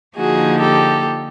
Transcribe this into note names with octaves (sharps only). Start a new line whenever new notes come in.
D3 F3 A#3 D#4 F#4 G#4
G4 A4